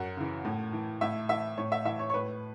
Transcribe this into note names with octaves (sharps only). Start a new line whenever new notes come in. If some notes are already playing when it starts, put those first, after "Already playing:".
Already playing: F#2 F#5
C#3 E3
A2
E3
A2 E5
E3 E5
A2 C#5
E5
E3 E5
C#5
C#5
A2 B4